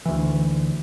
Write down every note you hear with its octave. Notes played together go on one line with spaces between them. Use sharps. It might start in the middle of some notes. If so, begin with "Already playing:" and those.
D2 E3